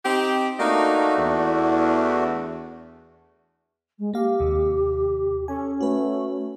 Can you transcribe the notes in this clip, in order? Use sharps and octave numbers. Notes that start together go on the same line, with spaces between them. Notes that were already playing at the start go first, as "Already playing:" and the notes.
C4 D#4 G4
A3 A#3 D4 D#4 F#4
E2
G#3
A#3 G4 F5
D#2 C3
C#4 A4 G#5
A3 F#4 B4